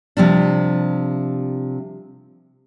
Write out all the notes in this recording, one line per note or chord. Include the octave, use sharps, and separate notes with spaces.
C3 F3 G3 D4